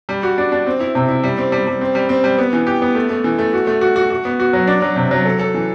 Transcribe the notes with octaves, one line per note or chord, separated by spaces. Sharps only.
G3
F#4
D4
D4
C4
E4
C3
E4
G3
C4
G3
G3
C4
G3
C4
G3
B3
E3
G4
B3
A3
A3
E3
A3
F#4
A3
F#4
F#4
F#4
B3
F#4
F#3
D4
F#3
C3
F#3
A4
A4
E3